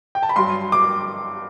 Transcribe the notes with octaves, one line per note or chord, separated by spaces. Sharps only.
G5
A5
B5
G2 F#3 C6
D6